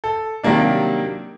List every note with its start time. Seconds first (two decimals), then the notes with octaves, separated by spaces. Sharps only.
0.04 A4
0.43 C3 D#3 F#3 G3 A#3 D4